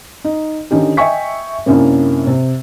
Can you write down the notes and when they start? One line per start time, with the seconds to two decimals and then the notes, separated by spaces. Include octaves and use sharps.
0.24 D#4
0.71 D3 D#3 C#4 D#4 G4
0.97 D#5 E5 G5 G#5 C#6 B6
1.66 F#2 C3 A#3 C#4 D4 E4
2.27 C3